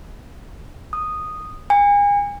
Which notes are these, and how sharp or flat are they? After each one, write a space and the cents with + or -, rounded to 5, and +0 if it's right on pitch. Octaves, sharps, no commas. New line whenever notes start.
D#6 -5
G#5 -35